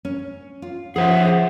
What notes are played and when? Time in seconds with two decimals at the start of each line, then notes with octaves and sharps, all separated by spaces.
0.05 C#4
0.62 F4
0.96 F3 G#4 C5 E5 F#5